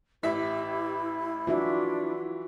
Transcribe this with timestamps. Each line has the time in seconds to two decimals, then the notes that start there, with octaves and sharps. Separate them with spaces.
0.23 A1 E4 G4 E5 B6
1.47 E3 D4 F4 F#4 E5